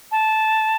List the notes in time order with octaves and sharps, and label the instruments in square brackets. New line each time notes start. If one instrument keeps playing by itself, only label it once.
[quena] A5